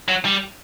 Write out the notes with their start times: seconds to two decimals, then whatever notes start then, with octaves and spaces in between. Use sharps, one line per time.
0.08 F#3
0.25 G3